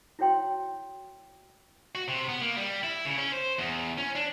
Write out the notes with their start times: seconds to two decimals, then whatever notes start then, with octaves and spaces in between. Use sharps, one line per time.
0.19 E4 F#4 C#5 G5 C6
1.95 F#4
2.08 C3
2.29 B3
2.42 A#3
2.57 G3
2.83 E4
3.05 C#3
3.18 C#4
3.32 C5
3.58 E2
3.98 C#4
4.15 D4